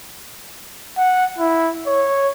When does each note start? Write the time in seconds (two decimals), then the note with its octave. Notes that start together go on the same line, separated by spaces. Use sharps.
0.97 F#5
1.39 E4
1.87 C#5